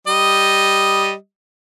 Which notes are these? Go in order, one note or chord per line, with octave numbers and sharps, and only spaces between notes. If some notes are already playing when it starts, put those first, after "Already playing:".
G3 D#5